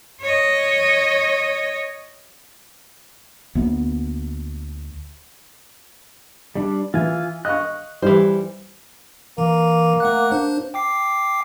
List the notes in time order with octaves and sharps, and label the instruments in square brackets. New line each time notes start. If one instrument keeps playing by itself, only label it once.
[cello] C#5 D#5
[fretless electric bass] D2 A#3 B3
[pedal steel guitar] G3 D4
[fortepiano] E3 [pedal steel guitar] F4 G#5
[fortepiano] D#5 F5 C#6 [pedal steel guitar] F#6
[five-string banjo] E3 C5 [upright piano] G3
[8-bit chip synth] E3 [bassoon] A#3
[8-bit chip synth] A3 F#5 F#6
D4 C5
G5 D6 C7